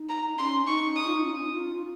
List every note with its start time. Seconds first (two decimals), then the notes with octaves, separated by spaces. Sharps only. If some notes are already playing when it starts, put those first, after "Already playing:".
Already playing: D#4
0.09 A#5
0.38 C#4 C6
0.67 D#4 C#6
0.96 D#6
1.07 F4
1.16 D#4
1.24 C#4
1.35 C#4
1.44 D#4
1.53 F4
1.76 F4